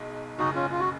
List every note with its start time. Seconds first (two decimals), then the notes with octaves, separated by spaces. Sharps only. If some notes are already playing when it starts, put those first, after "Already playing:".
Already playing: B1 B2 G#3 D#4
0.39 F#1 F#2 C#3 D#4 F#4
0.55 C#4 F4
0.71 F4
0.80 F#4